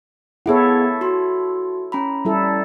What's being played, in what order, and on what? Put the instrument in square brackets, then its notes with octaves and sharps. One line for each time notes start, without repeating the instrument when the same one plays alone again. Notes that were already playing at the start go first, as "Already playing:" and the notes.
[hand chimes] B3 G#4 F#5 [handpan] E4 A4 C#5
[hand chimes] F#4 C6
C#4 A#5 B5
[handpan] G3 E4 A4